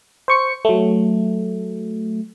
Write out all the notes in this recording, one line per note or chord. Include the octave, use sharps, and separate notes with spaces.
C5 C#6 C#7
F#3 A3